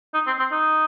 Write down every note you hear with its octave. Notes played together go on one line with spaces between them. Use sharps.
D#4
C4
C4
D#4